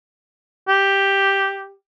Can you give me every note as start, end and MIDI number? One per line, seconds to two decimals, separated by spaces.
0.68 1.74 67